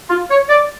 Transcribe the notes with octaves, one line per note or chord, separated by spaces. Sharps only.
F4
C#5
D5